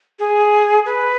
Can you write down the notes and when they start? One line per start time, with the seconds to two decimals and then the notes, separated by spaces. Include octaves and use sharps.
0.19 G#4
0.86 B4